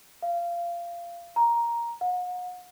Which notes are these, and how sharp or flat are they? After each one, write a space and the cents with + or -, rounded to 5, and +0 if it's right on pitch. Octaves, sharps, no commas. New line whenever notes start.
F5 -20
A#5 +5
F#5 -40